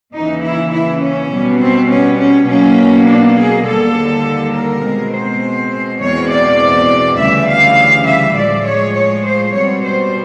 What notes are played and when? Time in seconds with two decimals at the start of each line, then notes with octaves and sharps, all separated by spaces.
0.12 D#2 C#3 E3 D#4
0.43 E4
0.71 E4
1.01 C#4
1.31 B2 G3 B3
1.60 C4
1.90 C#4
2.19 C#4
2.48 B2 F#3 A#3 C#4
3.08 D4
3.37 G#4
3.67 D#2 D3 G3 A#3 A4
4.55 A#4
4.84 B2 G#3 C4
5.14 C5
6.01 E2 B2 G#3 C4 C#5
6.31 D5
7.19 D2 C#3 E3 G3 E5
7.49 F5
8.07 E5
8.36 A2 F3 G#3 D5
8.66 C#5
8.96 C#5
9.26 C5
9.54 B2 G3 C4 C#5
9.83 C5